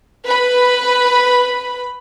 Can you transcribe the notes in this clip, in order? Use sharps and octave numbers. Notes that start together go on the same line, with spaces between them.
B4 B5